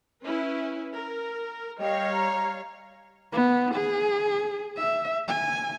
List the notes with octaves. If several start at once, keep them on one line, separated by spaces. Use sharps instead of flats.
C#4 E4 B4
A#4
G3 C#5 D#5 F5 G5
A#5
B3
G#4
E5
G#5